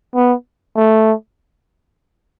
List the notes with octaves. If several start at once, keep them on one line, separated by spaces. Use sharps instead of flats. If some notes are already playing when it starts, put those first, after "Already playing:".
B3
A3